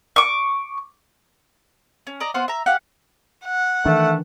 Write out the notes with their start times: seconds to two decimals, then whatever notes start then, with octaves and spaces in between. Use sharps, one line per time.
0.16 C#6 D6
2.07 C#4
2.20 D5 D#5 A#5
2.34 B3 C5 F5 F#5
2.48 E5 A#5
2.66 G4 F5 F#5
3.46 F#5
3.85 D#3 E3 A3 D4